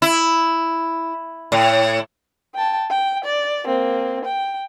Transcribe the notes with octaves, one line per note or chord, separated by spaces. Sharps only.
E4
A2
G5 A5
G5
D5
A#3 C4
G5